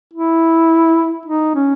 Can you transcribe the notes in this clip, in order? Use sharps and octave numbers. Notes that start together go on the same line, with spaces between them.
E4
D#4
C#4